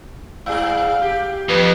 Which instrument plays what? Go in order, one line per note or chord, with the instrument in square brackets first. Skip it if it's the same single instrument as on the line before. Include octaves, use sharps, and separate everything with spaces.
[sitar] G#2 G#4 [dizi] F5
[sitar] G4
[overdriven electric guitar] F2 [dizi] B4